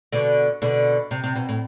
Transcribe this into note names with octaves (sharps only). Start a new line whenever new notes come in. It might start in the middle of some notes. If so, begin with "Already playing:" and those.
B2 D3
B2 D3
C3
C3
B2
A2